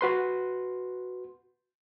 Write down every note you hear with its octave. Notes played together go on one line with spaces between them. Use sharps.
F#4 B4 C6